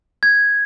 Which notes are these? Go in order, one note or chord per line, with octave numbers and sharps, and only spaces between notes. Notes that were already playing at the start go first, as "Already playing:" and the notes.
G#6